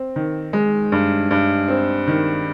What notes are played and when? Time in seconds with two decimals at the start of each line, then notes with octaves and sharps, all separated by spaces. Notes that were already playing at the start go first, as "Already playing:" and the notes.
Already playing: C4
0.16 D#3
0.53 G#3
0.92 G2
1.31 G2
1.68 C4
2.07 D#3